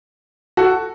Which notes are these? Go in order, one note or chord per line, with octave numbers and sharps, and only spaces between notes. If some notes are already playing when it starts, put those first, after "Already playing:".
F#4 A4